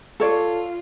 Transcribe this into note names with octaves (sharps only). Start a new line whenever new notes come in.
F4 A4 C#5 D5